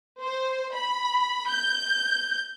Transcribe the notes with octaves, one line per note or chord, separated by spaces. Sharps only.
C5
B5
G6